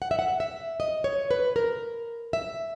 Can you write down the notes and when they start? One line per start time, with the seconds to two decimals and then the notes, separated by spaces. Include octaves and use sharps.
0.02 F#5
0.11 E5
0.19 F#5
0.40 E5
0.80 D#5
1.04 C#5
1.31 B4
1.56 A#4
2.33 E5